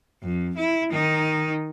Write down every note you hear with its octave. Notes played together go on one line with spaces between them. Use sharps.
F2
E4
D#3 D#4